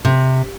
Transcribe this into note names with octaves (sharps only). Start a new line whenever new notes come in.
C3